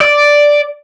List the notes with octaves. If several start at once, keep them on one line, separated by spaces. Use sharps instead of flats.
D5